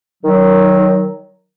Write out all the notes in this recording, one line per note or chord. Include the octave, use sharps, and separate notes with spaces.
D#3 F#3